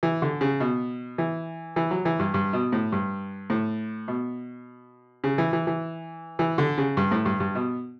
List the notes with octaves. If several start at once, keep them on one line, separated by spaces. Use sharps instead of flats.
E3
D3
C#3
B2
E3
E3
F#3
E3
G2
G2
B2
A2
G2
A2
B2
C#3
E3
E3
E3
E3
D3
C#3
G2
A2
G2
G2
B2